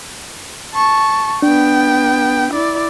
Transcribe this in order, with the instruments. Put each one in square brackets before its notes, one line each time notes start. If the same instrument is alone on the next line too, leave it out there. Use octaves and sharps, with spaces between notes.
[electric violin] A5 C#6
[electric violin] B3 G5 [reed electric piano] D4
[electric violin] E4 D5